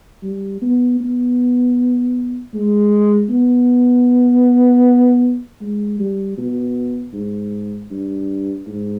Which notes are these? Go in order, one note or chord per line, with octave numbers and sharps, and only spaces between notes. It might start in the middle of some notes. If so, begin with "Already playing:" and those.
G3
B3
B3
G#3
B3
G#3
G3
B2
G#2
G2
G#2